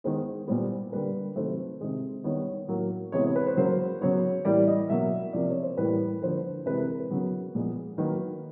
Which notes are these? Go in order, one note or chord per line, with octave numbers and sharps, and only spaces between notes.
D#3 G#3 B3 C5
A#2 G3 B3 C5
D3 G3 A#3 B4
C3 D#3 F#3 A3 C5
C3 D#3 G#3
D#3 G3 B3 C#5
A2 F#3 A#3
C3 E3 G#3 B3 C#5
C#5
B4
C5
C#3 F#3 A#3 C5
C#3 F#3 B3 C#5
A2 E3 G3 A#3 D5
D#5
B2 F#3 A#3 E5
C3 F3 A#3 D5
C#5
C5
A2 E3 G3 A#3 B4
D3 F3 A#3 C5
C3 E3 G#3 B4
A#4
A#4
B4
C#3 F#3 B3
A#2 F3 G#3 B3
D#3 F#3 A#3 B4